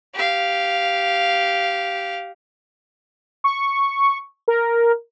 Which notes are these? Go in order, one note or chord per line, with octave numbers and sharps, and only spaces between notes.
G4 F5
C#6
A#4